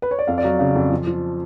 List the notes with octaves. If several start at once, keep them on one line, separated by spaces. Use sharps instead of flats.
B4
C#5
D5
F2 F5
D5
F#3 F5
C#3 F5
F2
F3
F3